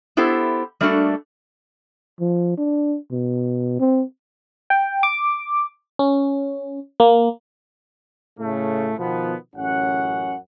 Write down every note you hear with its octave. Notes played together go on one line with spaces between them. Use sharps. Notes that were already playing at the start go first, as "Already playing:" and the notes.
B3 E4 G4 A4 C5
G3 A3 A#3 D4 F#4 A4
F3
D4
B2
C4
G5
D6
C#4
A#3
A2 C#3 A3
B2 D#3 F3 B3
A1 F#2 C#4 F#5